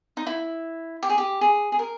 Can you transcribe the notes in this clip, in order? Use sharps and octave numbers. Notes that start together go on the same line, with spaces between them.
D#4
E4
G4
G#4
G4
G#4
G#4
A#4